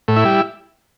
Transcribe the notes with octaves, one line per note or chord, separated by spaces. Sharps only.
A2
E4
G3